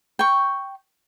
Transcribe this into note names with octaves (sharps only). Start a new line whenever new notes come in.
G5 C#6